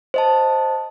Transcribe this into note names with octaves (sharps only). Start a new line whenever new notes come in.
C5 D#5 A5